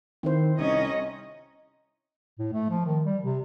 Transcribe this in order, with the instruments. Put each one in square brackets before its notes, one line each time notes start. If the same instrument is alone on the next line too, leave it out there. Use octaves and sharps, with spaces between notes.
[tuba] D#3 [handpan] C4 E4 C5
[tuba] C2 [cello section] C#4 C#5 D#5 [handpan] D#4
[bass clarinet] A2
A3
F3
D#3
G3
C3